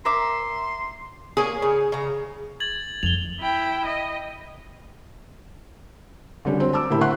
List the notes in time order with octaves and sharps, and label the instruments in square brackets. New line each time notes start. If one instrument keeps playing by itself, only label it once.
[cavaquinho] A#4 E5 D6 [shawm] C6
[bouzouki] A#3 C#4 G#5 [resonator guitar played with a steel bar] G#4
[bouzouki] C#3
C#3 A#5
[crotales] G#6 A6 F#7
[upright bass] F2 [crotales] F7 G7
[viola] E4 G5
D#5
[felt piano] D3 F#3 G3 C#4 D4
F#3 C4 C5
A5 D6 E6
A2 D3 A#3 E4 G4 B5
C5 E5 F#5 B5 C6 F#6